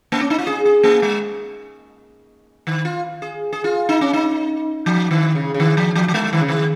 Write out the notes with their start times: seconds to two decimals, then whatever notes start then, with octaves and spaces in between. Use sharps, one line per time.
0.12 A#3
0.21 C#4
0.30 D#4
0.38 F4
0.47 G#4
0.65 G#4
0.84 A#3
1.02 G#3
2.67 D#3
2.85 F4
3.22 G#4
3.53 G#4
3.64 F4
3.89 D#4
4.01 C#4
4.13 D#4
4.86 F3
5.11 D#3
5.35 C#3
5.54 C#3
5.60 D#3
5.77 F3
5.95 F3
6.08 F3
6.14 G#3
6.33 D#3
6.41 C#3
6.48 D#3